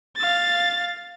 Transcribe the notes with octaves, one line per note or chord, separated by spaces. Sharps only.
F5 A6